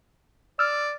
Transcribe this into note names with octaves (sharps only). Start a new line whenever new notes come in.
D5 E6 F6